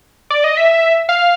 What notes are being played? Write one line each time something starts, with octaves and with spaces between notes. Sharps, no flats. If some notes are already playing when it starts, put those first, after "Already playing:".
D5
D#5
E5
F5